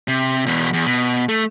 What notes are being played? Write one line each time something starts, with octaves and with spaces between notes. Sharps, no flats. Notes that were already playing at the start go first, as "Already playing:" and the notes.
C3
E2 B2
E2
B2
A3